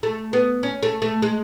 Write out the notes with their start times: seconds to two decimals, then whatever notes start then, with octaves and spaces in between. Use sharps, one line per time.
0.03 A3
0.33 B3
0.63 C#4
0.83 A3
1.02 A3
1.22 G#3